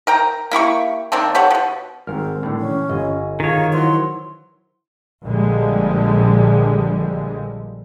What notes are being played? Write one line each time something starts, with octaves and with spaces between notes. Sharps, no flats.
A#4 G5 A#5
A#3 E4 G4 C#6
D#3 A#3 C4 D4
G4 A4 C#5 F#5
B2 F3
G#1 G#2 G3 C4 A#4 F6
A2 D3
A#2 E3 C#4
G1 D#5 G#5
D#3 F4 G#4 C#5
E3 F#3 E4 C5 C6
A#1 D3 F3 G3 G#3